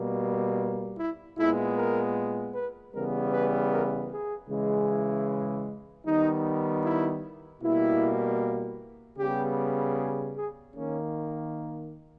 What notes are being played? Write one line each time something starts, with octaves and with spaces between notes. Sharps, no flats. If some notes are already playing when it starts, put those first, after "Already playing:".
Already playing: B2 G3 A#3
E4
A#2 G#3 B3 E4
A#4
B4
C#3 E3 G3 B3 A#4
B4
A#4
G#4
C#3 E3 G#3
E4
D#3 G3 B3 D#4
E4
B2 G3 A#3 E4
C#3 G3 B3 G4
G#4
G#4
D#3 A#3 C#4